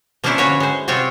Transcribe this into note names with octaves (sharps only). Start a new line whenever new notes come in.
F3 A#3 C#4 D4 E4 C5
D3 C#4 F#4 B4 C#5
G#3 C5
C3 F#3 C4 F4 C#5